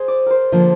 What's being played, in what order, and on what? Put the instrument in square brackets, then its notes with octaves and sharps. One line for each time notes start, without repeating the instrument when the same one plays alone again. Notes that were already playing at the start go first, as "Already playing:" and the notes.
Already playing: [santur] G#4 C5
D5
A#4 C5
[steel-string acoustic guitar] D3 F3 A#3 D4 [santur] A#4